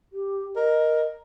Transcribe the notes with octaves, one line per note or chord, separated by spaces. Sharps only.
G4
A#4 D#5